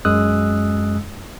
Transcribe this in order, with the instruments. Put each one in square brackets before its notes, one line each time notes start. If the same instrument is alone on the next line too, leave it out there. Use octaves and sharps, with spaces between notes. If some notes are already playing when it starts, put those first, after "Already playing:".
[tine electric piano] F#2 G#3 D#6 E6 F#6